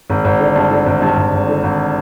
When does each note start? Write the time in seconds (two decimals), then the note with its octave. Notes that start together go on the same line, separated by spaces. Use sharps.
0.10 G#1
0.25 G#1
0.40 D3
0.55 G2
0.71 D3
0.86 G#1
1.02 G2
1.17 G#1
1.33 G#1
1.48 D3
1.63 G#1